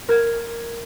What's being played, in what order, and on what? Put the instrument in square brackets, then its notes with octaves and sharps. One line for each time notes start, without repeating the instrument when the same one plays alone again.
[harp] A#4 G#6